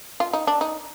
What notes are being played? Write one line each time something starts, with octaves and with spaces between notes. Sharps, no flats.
F4
D#4
D4
D#4